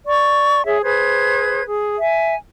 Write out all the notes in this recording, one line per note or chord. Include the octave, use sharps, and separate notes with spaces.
D5 C#6
G#4 C#5 E5
G#4 B4 C5 G#6
G#4
E5 G#5